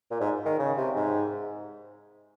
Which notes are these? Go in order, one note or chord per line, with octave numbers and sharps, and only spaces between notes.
A#2
G#2
D#3
C#3
C3
G#2